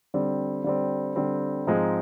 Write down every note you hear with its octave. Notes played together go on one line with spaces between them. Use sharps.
D3 G3 C4
D3 G3 C4
D3 G3 C4
G#2 F3 G#3 C4 D#4